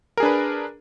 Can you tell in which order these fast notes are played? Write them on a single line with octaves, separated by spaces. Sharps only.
A#4 G#4 D4 B4